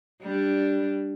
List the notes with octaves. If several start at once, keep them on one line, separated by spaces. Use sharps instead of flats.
G3 D4